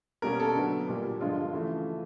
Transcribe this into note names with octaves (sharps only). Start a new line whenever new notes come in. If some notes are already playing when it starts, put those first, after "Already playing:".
B2 G3 A#3 C#4 A#4
A4
D3 F#3 B3
A#2 G3 A#3
G2 D3 F3 G#3 F4
C#3 E3 A3